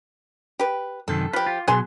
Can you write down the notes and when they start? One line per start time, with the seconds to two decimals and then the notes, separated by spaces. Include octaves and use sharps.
0.59 G4 B4
1.08 F#2 C3 D#3 A4
1.33 F3 G4 B4
1.46 F4
1.68 B2 F#3 G#4 G#5 C6